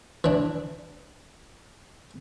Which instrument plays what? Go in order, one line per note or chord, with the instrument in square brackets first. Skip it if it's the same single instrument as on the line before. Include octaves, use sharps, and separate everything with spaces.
[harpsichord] E3 D4